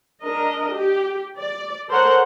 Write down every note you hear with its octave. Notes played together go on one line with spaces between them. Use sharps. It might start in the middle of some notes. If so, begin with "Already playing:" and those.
D4 A#4 D#5
G4
D5
A4 A#4 C5 C#5 F#5